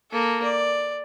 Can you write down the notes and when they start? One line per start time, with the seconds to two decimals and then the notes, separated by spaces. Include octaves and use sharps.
0.12 A#3 A4
0.43 D5